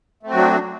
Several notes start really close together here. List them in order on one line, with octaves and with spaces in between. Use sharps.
A3 C4 F#4 F#3 D4